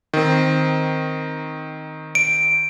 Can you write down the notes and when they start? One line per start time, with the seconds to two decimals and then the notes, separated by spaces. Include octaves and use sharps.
0.13 D#3 C4
2.15 D7